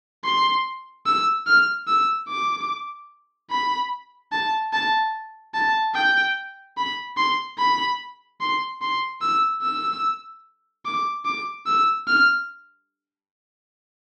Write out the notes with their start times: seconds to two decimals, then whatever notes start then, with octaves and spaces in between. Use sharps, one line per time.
0.24 C6
1.06 E6
1.47 F6
1.88 E6
2.28 D6
3.50 B5
4.32 A5
4.73 A5
5.54 A5
5.95 G5
6.77 B5
7.17 C6
7.58 B5
8.41 C6
8.81 C6
9.21 E6
9.62 E6
10.85 D6
11.25 D6
11.67 E6
12.08 F6